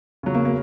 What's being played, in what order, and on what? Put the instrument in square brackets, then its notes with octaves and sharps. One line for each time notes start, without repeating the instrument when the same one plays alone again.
[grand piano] C#3 F#3
A#3
A#3